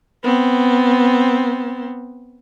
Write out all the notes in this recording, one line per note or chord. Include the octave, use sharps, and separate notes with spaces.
B3 C4